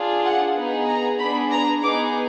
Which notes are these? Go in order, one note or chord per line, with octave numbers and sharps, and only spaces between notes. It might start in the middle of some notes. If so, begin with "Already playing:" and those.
Already playing: D4 F4 G#4
F#5
B3 D#4 G#4
A#5
B3 D4 G#4 B5
A#5
B3 D#4 G#4 D6